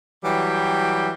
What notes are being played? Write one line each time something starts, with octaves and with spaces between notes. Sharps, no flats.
E3 F#3 G3 G5